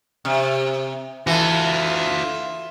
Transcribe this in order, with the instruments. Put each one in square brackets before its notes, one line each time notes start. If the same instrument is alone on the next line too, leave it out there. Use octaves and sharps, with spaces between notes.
[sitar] C3
[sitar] E3 [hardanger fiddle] F4 E5 [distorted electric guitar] F#4 A4